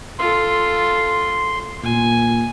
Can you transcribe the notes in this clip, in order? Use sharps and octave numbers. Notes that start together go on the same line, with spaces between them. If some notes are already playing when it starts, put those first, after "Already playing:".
F4 A4 C6
A#2 G#5